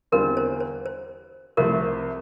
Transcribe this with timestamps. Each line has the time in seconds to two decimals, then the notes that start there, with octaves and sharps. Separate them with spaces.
0.12 E2 D3 G3 C4 F4 A#4
0.37 C5
0.60 C5
0.86 C5
1.57 C2 C3 F3 A3 A#4